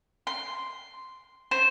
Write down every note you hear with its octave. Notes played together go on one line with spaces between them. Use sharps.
C6
C5